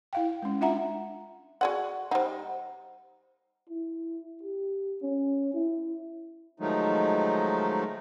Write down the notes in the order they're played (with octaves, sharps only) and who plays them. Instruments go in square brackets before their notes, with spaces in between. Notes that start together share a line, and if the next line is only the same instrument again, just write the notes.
[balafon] E4 F5 G5
G#3 C#4
D4 F4 E5 F#5 A#5
[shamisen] F#4 G#4 F#5 [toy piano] D5 C6
[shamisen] G3 D#4 [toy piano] C5 F#5
[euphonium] E4
G4
C#4
E4
[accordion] D#3 F3 F#3 G#3 A3 D#4